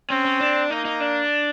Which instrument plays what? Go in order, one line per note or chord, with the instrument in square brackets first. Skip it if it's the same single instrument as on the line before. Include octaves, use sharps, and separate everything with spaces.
[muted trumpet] C4 [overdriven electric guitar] C#4
[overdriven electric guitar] C#4
D4
[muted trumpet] A#3 [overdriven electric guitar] D#4
[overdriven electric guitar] D#4
D4